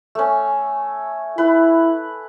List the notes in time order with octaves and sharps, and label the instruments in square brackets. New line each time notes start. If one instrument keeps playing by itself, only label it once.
[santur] A3 C#4
[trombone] E4 [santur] B4